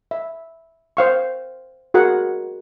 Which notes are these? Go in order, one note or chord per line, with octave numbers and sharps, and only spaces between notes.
E5
C5 F5 C#6
F#4 G#4 A#4 F#5